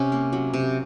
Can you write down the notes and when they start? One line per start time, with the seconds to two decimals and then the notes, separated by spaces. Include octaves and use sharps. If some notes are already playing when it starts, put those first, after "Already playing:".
Already playing: C3 C#4
0.12 A#3
0.33 F#3
0.54 C3